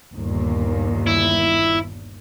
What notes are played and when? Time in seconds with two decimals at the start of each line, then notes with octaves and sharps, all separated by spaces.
0.13 G1 D#2 A#2
1.07 E4